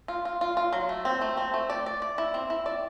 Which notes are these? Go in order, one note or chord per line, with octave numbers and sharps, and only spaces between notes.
F4
F4
F4
F4
F#3
A3
C4
A3
C4
A3
D5
D5
D5
E4
C4
E4
D5